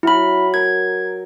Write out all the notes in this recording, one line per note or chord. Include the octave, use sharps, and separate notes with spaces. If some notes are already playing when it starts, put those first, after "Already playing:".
F#3 E4 B5
A#4 G#6